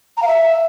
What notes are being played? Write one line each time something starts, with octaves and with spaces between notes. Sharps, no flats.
A#5
F5
E5